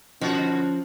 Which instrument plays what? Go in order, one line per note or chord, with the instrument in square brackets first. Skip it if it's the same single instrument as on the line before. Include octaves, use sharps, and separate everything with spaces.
[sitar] B2 D3 F#4 [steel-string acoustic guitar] F3 [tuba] C#4